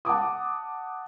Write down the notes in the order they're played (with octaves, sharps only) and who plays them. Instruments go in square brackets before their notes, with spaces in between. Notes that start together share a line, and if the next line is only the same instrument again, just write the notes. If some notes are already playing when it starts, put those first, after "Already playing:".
[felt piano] F#5 A5 D6 D#6